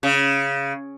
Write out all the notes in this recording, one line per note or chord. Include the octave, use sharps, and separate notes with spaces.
C#3